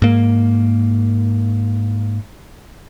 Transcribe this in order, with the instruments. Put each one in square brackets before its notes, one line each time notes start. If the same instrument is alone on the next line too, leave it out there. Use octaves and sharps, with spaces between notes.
[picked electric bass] G#2 A#3